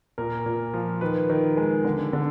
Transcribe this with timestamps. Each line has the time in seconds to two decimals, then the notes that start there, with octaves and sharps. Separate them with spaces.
0.18 A#2 A#4
0.46 A#2
0.74 F3
1.01 D#3 B4
1.30 D#3
1.57 G#3
1.85 D3
2.13 D3